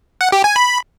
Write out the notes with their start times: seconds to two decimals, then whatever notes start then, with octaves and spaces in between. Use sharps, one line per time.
0.21 F#5
0.32 G4
0.44 G#5
0.56 B5